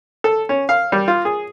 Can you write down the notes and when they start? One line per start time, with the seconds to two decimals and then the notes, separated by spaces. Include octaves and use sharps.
0.24 A4
0.49 C#4
0.69 F5
0.92 G3
1.08 F4
1.25 G#4